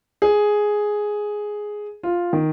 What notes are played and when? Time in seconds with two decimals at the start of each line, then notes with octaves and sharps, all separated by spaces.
0.22 G#4
2.03 F4
2.33 D#3